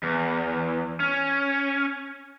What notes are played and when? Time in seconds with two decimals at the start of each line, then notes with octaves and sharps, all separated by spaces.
0.03 E2
1.00 C#4